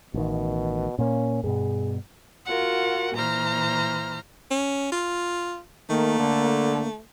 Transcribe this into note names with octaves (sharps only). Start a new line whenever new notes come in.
A1 B2 D#3
A#2 A#3 C#4
G2 B2 G#4
F4 F#4 A#4 F#5
A#2 E3 C5 A#5 F6
C#4
F4
D#3 A3 A#3
D3